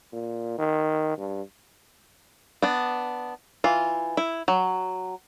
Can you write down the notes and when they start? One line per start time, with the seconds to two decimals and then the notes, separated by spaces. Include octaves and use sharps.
0.13 A#2
0.58 D#3
1.17 G2
2.62 B3 D4
3.64 E3 F4
4.17 E4
4.48 F#3